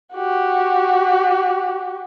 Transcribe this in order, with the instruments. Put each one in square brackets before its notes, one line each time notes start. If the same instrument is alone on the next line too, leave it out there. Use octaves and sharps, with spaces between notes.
[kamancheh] F#4 G4